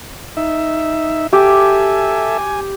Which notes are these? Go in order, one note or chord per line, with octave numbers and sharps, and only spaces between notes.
D#4 E5
G4 A4 E5 G#5
G#5